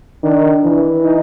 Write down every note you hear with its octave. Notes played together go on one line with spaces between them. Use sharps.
D#3 D4
E3
D#4